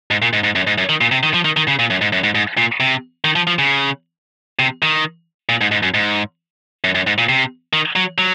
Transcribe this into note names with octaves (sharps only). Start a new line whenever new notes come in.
G#2
A#2
G#2
G#2
F#2
G#2
F#2
D#3
A#2
C3
D#3
F3
D#3
D#3
C#3
A#2
F#2
G#2
F#2
G#2
G#2
A#2
C3
D#3
F3
F3
C#3
C3
D#3
A#2
G#2
G#2
F#2
G#2
F#2
F#2
G#2
A#2
C3
D#3
F#3
F#3